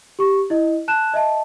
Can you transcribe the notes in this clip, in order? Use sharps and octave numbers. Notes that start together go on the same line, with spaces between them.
G4 C#6
E4 D#5
A5 F#6 E7
D#5 E5 A5